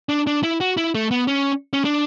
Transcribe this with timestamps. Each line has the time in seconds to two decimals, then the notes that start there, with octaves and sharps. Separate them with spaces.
0.09 D4
0.27 D4
0.43 E4
0.60 F#4
0.77 E4
0.95 A3
1.11 B3
1.28 C#4
1.73 C#4
1.85 D4